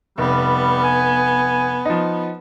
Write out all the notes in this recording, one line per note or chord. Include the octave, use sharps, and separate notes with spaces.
F1 G3 B3
G#5
F3 D#4